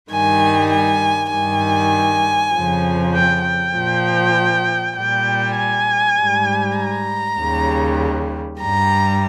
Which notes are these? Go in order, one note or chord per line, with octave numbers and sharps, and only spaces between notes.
G2 D#3 G3 G#5
G#5
G2 D#3 G3 G#5
F2 C#3 F3
G5
G5
A#2 F3
A#2 G3 G5
G#5
G#2 G3
A#5
D#2 C#3 G3
G2 G3 A#5